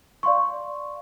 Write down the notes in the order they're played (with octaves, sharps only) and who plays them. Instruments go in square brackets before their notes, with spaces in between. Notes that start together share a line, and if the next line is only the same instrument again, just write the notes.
[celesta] D5 F5 C6 C#6